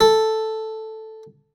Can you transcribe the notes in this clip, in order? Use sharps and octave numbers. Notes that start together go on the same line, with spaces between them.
A4